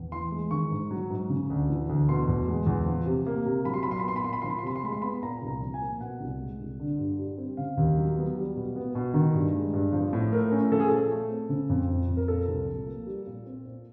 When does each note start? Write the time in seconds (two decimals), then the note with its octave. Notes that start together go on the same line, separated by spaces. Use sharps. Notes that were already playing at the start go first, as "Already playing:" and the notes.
Already playing: E2
0.12 E3 C6
0.31 G#3
0.51 D#3 C#6
0.71 G#2
0.91 F#3
1.10 G#2
1.29 C#3
1.50 D2
1.69 E3
1.89 D2
2.09 B2 C6
2.28 E2
2.48 G#3
2.67 E2
2.86 F3
3.06 C3
3.27 A#3
3.46 C3
3.65 F#3 B5
3.74 C6
3.83 A#2 B5
3.91 C6
3.99 B5
4.04 B3 C6
4.16 B5
4.24 A#2 C6
4.33 B5
4.42 F3 C6
4.50 B5
4.58 C6
4.63 C3 B5
4.76 C6
4.83 G#3 B5
4.92 C6
5.02 B3 B5
5.23 A#2 A#5
5.42 C2
5.48 A#5
5.62 F3
5.74 G#5
5.81 A#3
6.00 B2 F#5
6.20 C2
6.40 G#3
6.59 C2
6.79 D3
6.99 G2
7.19 G3
7.38 C4
7.57 C#3 F5
7.77 D#2
7.97 F#3
8.17 B3
8.36 G3
8.56 B2
8.76 B3
8.95 B2
9.14 D#3
9.34 G2
9.54 G#3
9.74 G2
9.93 F3
10.13 A2
10.32 A3 A#4
10.52 C#4
10.72 F3 A4
10.80 G#4
10.88 A#2 A4
11.11 A3
11.30 C4
11.49 C#3
11.70 F2
11.89 F3
12.08 F2
12.17 A#4
12.28 A#2 A4
12.48 C2
12.68 F3
12.87 A#3
13.06 G3
13.27 A#2
13.46 C4
13.66 A#2